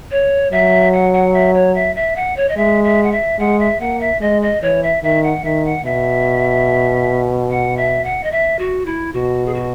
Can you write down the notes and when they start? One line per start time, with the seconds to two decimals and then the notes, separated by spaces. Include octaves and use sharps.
0.11 C#5
0.52 F#3 E5
0.93 F#5
1.13 F#5
1.34 E5
1.54 C#5
1.75 E5
1.96 E5
2.16 F#5
2.37 C#5
2.49 D#5
2.57 G#3 E5
2.84 E5
3.03 F#5
3.12 E5
3.39 G#3 F#5
3.60 E5
3.80 A#3 F#5
4.01 E5
4.21 G#3 D#5
4.42 D#5
4.62 E3 C#5
4.83 E5
5.03 D#3 E5
5.23 F#5
5.44 D#3 E5
5.65 F#5
5.85 B2 E5
7.50 F#5
7.77 E5
8.04 F#5
8.24 D#5
8.32 E5
8.59 F#4
8.86 E4
9.13 B2 F#4
9.46 G#4
9.55 F#4